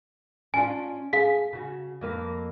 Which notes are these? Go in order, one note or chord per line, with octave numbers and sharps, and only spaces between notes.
C#4 D4 F4 G#5
G#4 F5 B6
C#3 F#4
F2 A#3 B4